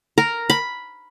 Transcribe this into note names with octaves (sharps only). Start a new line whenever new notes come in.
A#4
B5